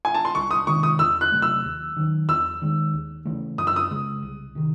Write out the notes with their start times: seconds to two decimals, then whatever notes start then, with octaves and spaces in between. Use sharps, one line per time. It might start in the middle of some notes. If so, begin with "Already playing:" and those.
0.05 G#5
0.15 A5
0.25 C6
0.35 C2 C#6
0.51 D#6
0.67 C3 D#3 G#3 C#6
0.83 D#6
0.99 E2 E6
1.21 F#6
1.32 C3 F#3 A3
1.42 E6
1.64 D#2
1.96 D#3 F#3
2.29 E2 E6
2.62 D#3 G#3
2.93 D#2
3.25 C#3 E3 A3
3.58 F#2 D#6
3.67 E6
3.76 D#6
3.91 C#3 G#3
4.23 C2
4.55 C3 D#3